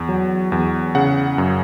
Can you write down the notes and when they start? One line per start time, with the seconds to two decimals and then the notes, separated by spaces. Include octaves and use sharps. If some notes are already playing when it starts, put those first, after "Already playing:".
Already playing: E2
0.09 F#3
0.52 E2
0.95 C#3 F#5
1.38 F#2